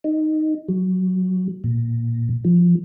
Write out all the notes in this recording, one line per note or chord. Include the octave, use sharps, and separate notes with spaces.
D#4
F#3
A#2
F3